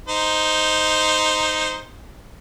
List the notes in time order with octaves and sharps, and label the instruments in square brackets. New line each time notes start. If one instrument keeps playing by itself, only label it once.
[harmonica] D#4 C5